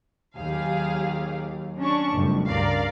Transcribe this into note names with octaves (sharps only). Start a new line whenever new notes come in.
D#2 F#3 G4 G#4 F5
C#4 D4 C#6
F#1 F2 A2 G3
C#2 G2 C#3 A#4 D5 F5